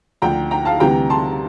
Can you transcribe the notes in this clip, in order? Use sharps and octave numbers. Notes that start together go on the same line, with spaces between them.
D2 D3 F3 G5 A#5
G5 A#5
F5 A5
D2 C3 E3 G3 G5 A#5
A5 C6